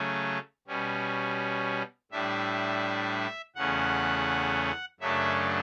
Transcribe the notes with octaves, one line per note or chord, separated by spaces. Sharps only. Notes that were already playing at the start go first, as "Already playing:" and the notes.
Already playing: C#3 F#3 A3 C#4
B2 G3 C#4
A2 G3 D4 E5
E2 C#3 E3 A3 C#4 F#5
F#2 C#3 F#3 A3 D4 E5